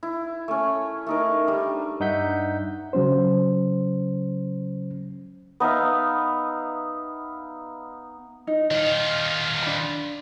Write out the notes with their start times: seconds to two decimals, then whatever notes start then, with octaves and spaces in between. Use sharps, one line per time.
0.03 E4
0.48 A3 C#4
1.07 A3 D#4 A#4
1.47 G3 D4
2.00 G2 D#4 E5 F#5 G6 B6
2.93 C#3 F#3 C#4 C5
5.60 B3 D#4 E5 F5
8.47 D#4
8.71 D#3 F4 D#5
9.62 D4 B5